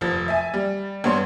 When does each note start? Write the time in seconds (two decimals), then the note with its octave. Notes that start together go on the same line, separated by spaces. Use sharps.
0.01 F1 F3 A6
0.28 E5 G#5
0.54 G3
1.04 G2 B3 C#5 C6